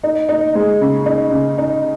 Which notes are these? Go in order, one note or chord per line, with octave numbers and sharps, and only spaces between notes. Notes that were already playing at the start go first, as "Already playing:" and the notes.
D#4
D#4
G#3
C#3
D#4
C#3
D#4